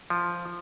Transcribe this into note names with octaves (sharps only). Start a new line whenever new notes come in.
F3